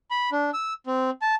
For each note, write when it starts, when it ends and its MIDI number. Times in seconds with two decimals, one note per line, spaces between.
0.11 0.30 83
0.32 0.50 62
0.54 0.73 88
0.86 1.10 60
1.22 1.35 81